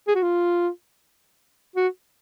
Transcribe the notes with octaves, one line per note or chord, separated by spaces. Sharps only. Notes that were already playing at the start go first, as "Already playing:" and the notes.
G#4
F#4
F4
F#4